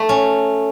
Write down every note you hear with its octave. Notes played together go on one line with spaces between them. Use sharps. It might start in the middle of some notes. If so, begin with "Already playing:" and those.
Already playing: A3
C#4